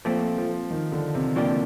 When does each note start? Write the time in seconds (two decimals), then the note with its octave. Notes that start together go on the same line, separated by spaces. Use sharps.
0.05 A#2 F3 A3 C4
0.38 F3
0.71 D#3
0.92 D3
1.15 C3
1.36 A2 F3 A#3 D4 G4